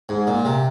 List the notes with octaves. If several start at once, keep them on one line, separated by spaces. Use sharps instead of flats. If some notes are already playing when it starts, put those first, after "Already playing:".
G#2
A#2
C3